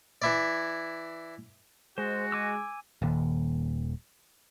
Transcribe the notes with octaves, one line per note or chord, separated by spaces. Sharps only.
E3 E4 D5
G#3 F#4 C5
G#5 D6 E6
D#1 D#2